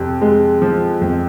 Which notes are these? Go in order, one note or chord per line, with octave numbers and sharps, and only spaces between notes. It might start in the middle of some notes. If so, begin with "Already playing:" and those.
Already playing: F2 C3
G#3
F3
F2